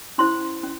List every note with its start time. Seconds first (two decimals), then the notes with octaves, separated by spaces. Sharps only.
0.18 C#4 E4 C5 C6
0.63 C#4